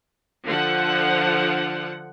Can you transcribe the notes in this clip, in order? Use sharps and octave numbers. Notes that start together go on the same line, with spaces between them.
D3 F3 F#5